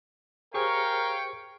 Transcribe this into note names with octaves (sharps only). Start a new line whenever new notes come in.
G4 G#4 A#4 C5 C#5 F5 G5 C#6